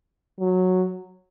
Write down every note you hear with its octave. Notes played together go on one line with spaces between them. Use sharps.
F#3